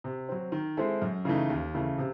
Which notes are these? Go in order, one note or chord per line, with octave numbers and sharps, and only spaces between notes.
C3
F#3 C4
D#3
G#3 C4 E4 A4
F#2
C#3 E3 A3 D#4
D#2
C#3 E3 A3
C3